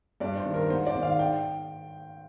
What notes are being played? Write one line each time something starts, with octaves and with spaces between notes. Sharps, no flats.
G2 D5
C5
D#3
A#4
G#2 C5
D5
D#3
F5
G5